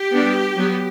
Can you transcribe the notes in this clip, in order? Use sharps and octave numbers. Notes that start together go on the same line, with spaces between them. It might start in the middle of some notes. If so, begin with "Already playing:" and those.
Already playing: G4
G3 B3 D4
F#3 B3